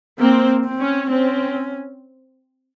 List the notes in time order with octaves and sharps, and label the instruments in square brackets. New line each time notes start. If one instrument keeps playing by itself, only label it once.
[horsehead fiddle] A#3 [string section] C4
[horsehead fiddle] C4
[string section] C#4
[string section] C4 [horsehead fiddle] C#4